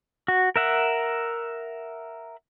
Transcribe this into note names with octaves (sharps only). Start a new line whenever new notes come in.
F#4
A#4 E5 F#5